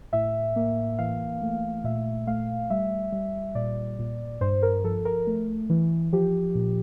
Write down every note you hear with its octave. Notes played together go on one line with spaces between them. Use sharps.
A2 E5
A#3
E3 F5
A3
A#2 E5
A3 F5
G3 E5
G3
A#2 D5
A#2
G2 C5
A#4
F3 A4
A#4
A3
E3
F3 G4
A#2